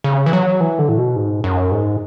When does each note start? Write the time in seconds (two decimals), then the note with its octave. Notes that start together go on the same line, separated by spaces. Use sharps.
0.04 C#3
0.26 E3
0.33 F#3
0.61 E3
0.79 D3
0.88 A2
0.98 B2
1.16 G#2
1.44 F#2
1.72 G#2